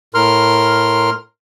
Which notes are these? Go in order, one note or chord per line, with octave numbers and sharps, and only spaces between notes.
A2 A#4 C6 F6